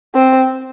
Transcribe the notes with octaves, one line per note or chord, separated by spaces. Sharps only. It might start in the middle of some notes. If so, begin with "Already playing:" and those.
C4